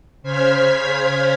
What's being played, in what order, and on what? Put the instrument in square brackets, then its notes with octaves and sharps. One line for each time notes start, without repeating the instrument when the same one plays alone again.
[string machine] C#3 C5 F6 G#6 B6